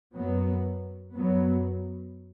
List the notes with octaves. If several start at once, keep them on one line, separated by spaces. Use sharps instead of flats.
F#2 F#3 B3
F#2 F#3 B3